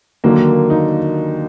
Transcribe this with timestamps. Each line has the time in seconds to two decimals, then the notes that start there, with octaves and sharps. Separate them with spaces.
0.24 D#2 D3 F#3 A#3
0.70 D#4